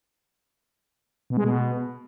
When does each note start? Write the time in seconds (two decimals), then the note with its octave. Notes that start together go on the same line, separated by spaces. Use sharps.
1.30 B2
1.37 G#3
1.44 B2